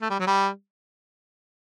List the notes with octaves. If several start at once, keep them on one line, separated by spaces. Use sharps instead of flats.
A3
G3
F#3
G3